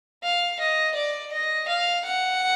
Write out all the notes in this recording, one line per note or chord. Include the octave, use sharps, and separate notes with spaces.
F5
D#5
D5
D#5
F5
F#5